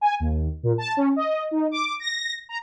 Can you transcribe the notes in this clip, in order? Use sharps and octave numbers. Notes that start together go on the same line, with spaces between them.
G#5
D#2
A#2
A5
C#4
D#5
D#4
D6
A#6
A#5